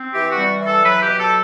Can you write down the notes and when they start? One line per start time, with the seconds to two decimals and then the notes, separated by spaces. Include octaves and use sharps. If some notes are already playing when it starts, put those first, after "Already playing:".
Already playing: C4
0.14 E3 G4
0.31 F#4
0.37 G3
0.61 E3
0.67 A4
0.84 F#3 B4
1.01 G4
1.07 B2
1.19 A4